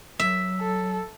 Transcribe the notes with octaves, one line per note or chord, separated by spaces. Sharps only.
F#3 E5
A4